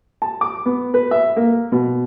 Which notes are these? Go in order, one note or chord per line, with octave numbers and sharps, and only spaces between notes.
A5
D6
B3
B4
E5
A#3
B2